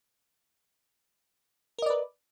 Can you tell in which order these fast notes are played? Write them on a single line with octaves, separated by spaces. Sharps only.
A#4 D#5 D5 B4